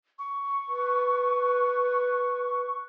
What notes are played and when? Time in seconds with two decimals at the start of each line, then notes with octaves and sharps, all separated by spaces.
0.19 C#6
0.68 B4